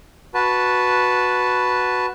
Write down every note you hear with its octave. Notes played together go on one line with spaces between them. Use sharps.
F#4 B4 A5